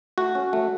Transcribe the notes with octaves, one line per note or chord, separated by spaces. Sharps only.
A3 F#4
C#4
A3